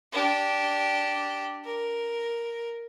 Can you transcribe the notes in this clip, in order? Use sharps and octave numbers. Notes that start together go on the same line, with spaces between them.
D4 G4
A#4